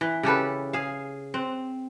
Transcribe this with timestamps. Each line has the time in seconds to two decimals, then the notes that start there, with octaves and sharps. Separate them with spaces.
0.01 E3
0.23 C#3 G4 A4 B4
0.73 G#4 F5
1.34 C4